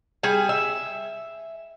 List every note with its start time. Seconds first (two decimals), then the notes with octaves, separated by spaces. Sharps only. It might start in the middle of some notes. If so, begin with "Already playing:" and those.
0.23 G3 G#4 G#5
0.49 E5